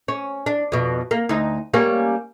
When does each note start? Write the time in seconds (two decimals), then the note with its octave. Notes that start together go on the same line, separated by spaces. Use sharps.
0.08 C#4
0.46 D4
0.72 F2 B2
1.11 A#3
1.29 D2 D#4
1.74 G3 A#3 C#4